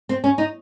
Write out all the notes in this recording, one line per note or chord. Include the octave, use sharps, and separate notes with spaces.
C4
C#4
D#4